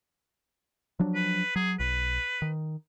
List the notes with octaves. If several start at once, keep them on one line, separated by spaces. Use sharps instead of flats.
F3 F#3 D4
B4
F#3 G#4
B1 B4
D#3